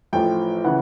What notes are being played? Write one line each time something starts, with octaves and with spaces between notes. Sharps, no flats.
A1 A2 F3 G5
C#3 E3 F#5